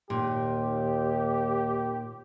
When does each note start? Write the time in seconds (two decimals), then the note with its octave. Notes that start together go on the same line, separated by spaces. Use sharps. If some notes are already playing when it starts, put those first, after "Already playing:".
0.10 D#2 A#2 G4